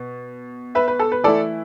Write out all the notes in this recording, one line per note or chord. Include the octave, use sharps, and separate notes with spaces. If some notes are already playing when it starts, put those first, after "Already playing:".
Already playing: B2
B4 E5
B4
A4
B4
E3 A3 E4 A4 D5